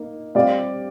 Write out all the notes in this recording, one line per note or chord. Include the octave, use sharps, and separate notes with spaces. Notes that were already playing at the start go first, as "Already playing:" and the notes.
Already playing: A#3 D#4
G3 C4 G4 D5 F5